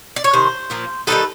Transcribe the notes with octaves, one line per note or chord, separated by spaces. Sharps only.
D5
C#5
C3 D#3 C5
A#2 F3 A#3
D#3 G3 C4 D#4 A4 B4